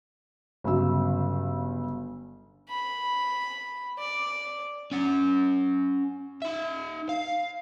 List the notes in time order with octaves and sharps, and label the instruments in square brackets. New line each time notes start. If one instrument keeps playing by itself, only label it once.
[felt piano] G1 C#3 F#3 E6
[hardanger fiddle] B5
D5
[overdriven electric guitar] C#4 F#5
D#4 E5
F5